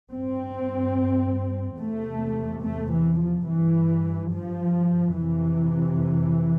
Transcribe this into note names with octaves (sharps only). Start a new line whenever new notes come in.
G2 C4
E2 C3 A3
A3
E3
F3
G2 E3
F3
F2 C3 E3